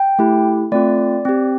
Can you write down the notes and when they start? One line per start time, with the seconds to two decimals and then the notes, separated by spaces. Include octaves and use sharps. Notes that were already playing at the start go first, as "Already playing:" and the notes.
Already playing: G5
0.19 A3 E4 G4
0.72 A3 C4 F4 D5
1.25 C4 G4